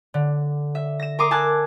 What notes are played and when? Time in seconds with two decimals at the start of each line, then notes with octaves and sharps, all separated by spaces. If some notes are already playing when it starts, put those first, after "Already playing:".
0.14 D3
0.75 E5
1.00 A#6 E7
1.19 A#4 A#5 C6 D6 D#6
1.31 G#5 A5 E6 F#6 G#6